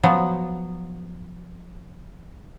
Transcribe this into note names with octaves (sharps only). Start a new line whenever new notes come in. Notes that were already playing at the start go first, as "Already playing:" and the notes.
F3 F#3 B3